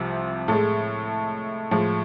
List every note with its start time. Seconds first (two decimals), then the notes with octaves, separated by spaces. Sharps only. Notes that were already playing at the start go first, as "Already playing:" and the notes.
Already playing: C2 C3 F3
0.48 A2 G#3 A4
1.71 A2 F3 G#3